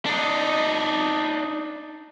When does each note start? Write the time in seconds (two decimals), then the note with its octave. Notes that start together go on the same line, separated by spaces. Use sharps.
0.06 D4 D#4